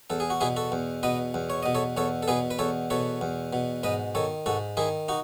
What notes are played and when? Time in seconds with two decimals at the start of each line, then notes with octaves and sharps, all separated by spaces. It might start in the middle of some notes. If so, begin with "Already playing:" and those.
0.10 E2 A4
0.20 G#4
0.30 F#4
0.41 B2 E4 G#4
0.56 F#4 A4
0.72 E2
1.03 B2 B4 D#5
1.34 E2
1.50 C#5
1.63 B2 D#5
1.75 A4 C#5
1.97 E2 A4 C#5
2.23 A4
2.28 B2 G#4 B4
2.51 B4
2.59 E2 A4 C#5
2.90 B2 A4 C#5
3.21 E2
3.53 B2
3.83 G#2 B4 D#5
4.15 D#3 A4 C#5
4.46 G#2 F#4 A4
4.77 D#3 E4 G#4
5.08 D#4 F#4